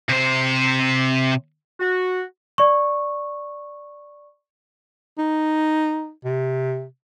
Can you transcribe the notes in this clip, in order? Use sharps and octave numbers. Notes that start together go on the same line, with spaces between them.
C3 C5
F#4
D5 C#6
D#4
C3